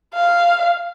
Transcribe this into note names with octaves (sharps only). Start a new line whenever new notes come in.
F5